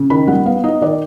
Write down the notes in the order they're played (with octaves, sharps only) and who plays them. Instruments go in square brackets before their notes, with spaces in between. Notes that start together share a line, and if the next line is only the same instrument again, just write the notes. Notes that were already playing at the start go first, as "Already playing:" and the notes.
Already playing: [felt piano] C#3
D#3 B5
G3 F#5
B3 F5
D#4 D#5
D#3 D5